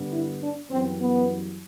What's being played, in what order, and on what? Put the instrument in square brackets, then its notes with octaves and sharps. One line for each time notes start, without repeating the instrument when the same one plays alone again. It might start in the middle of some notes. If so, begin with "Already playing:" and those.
Already playing: [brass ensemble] G2 D3 G3 B3
E4
D4
F#2 E3 G3 B3 C4
B3